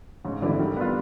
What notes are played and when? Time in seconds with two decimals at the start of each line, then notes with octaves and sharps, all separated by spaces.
0.25 G#2 C#3
0.42 D3 E3 G3 C4 E4
0.59 D#3 G3
0.77 B3 D4 F4